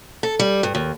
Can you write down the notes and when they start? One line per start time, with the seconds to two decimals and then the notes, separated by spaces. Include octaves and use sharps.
0.23 A4
0.39 G3
0.63 G2
0.75 D#2